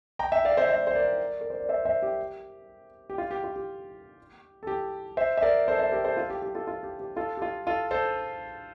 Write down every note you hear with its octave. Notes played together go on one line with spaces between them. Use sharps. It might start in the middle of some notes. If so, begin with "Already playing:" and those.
G5 A#5
E5 G5
D5 F5
C5 E5
E5
D5
C5
A#4 D5
A#4
C5
D5
C5 E5
C5 E5
G4
G4
F4
G4
F4
G4
A4
G4
C5 E5
E5
A#4 D5
A4 C5
C5 E5
G4 A#4
A4 C5
F4 A4
G4
G4
F4 A4
F4
G4
G4
F4 A4
G4
F4
F4 A4
A4 C5